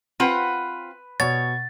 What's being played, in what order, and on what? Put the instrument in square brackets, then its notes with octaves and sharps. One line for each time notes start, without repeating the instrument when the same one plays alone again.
[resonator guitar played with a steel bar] C4 F4 F#5 [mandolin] B4
[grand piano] B2 [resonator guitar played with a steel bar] C#5 [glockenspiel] A6